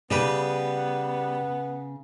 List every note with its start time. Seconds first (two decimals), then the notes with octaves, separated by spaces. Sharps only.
0.11 C#3 G3 B3 G4 B4